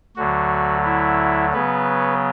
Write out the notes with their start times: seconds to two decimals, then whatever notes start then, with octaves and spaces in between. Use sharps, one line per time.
0.16 D2 D3 F#3 F#4
0.84 E4
1.53 C#3 F#3 B3 B4